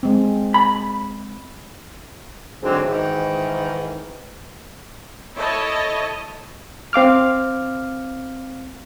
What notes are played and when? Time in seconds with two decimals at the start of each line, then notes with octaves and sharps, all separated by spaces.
0.03 G#3 C4
0.54 B5
2.63 G#2 D3 F#3 C4
2.85 G#2 D#3 E3
5.36 E4 A4 C#5 D#5 A5
6.93 C4 F5 D6 F6